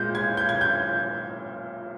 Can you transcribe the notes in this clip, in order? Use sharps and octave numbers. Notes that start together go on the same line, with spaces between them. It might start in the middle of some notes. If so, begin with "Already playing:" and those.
Already playing: A#2 G#3 G6
G#6
G6
G#6
G6